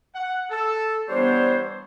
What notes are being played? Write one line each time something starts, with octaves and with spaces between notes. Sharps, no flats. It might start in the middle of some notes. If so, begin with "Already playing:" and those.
F#5
A4
E3 G3 B3 D4 C5 C#5